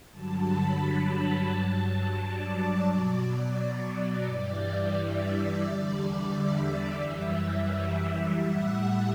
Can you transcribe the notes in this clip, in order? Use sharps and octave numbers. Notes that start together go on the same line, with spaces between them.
G2 D3 F#3 A5
B5
A5
G2 F#3
D5
B2 F#3
G2 E3 G3
E5
E2 D3 G3 D5
E5
F#2 E3 G3
A2 G3 F#5